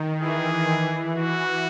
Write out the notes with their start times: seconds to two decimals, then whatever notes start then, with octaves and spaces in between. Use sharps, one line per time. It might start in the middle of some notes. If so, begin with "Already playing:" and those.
Already playing: D#3
0.21 E3 G#4
0.69 E3
1.15 F#4